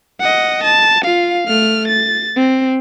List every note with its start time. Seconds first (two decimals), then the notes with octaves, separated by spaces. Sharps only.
0.20 D#5 F#5
0.64 A5
1.04 F4 F5
1.47 A3 F6
1.88 A6
2.36 C4